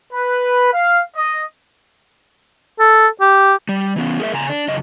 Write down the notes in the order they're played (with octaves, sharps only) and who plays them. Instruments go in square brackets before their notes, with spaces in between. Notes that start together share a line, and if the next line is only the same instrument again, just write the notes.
[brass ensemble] B4
F5
D#5
[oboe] A4
G4
[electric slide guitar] G3
E3 B3 C#4
G#4 A#4 E5
C#3 G#5 A#5
D4
F#2 C#3 D#5